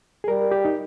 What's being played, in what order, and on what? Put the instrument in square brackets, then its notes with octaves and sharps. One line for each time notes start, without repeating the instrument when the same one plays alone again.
[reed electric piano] G#4
[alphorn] G3 [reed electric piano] A#4
[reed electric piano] G4
D#4